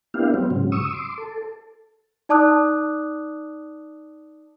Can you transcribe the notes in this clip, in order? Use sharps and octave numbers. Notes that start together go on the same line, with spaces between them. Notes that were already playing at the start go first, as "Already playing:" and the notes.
A#3 B3 D4 E4 G4 F5
F#3 G3 B3 C4
G#2 C#3 F#3
C#6 D#6 E6
C6 D6
A4
D#4 D5 A5 D6 D#6 F#6